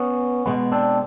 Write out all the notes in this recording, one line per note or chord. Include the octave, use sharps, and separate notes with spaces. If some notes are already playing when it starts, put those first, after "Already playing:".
Already playing: B3 C#4
B2 G#3 B3
C4 D4